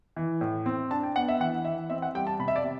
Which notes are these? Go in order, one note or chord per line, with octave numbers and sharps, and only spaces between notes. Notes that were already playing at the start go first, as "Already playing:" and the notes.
E3
A2
C4
D4 A5
G5
B3 F#5
E5
E3 F#5
E3 E5
C4 E5
F#5
G3 G5
A5
C3 B5
E5
D5
C3